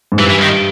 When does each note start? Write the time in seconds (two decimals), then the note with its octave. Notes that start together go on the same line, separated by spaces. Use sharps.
0.12 G#2
0.18 G2 E3
0.30 E3
0.42 D#3